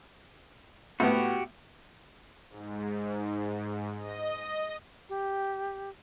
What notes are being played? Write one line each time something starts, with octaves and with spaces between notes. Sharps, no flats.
A2 B3 F#4 G4
G#2
D#5
G4